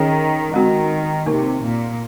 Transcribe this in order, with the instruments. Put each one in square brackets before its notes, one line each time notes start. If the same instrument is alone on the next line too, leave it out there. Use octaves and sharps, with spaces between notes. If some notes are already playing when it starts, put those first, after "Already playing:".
Already playing: [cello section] D#3 [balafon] C#4 G#4 C#5
[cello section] D#3 [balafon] G#3 C4 F#4
[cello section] C3 [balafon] A#3 D#4 A#4
[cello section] A#2